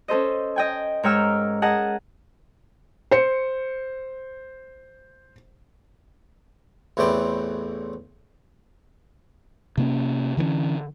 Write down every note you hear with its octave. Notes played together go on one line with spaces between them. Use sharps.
C#4 A4 C5 D#5
D#5 G5 G#5
G#2 A#4 C#5 G5 E6 F6
G#4 A#4 D#5 F#5 A5
C5 C#7
A1 E2 A2 E3 C4 D5
C3 A#3 C#4
D3 E3 G#3 C#4